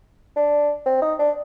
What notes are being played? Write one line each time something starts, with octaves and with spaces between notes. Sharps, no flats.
D4
C4
D#4
D4